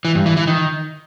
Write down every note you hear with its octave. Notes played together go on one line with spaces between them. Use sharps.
E3
G2
E3
E3
D#3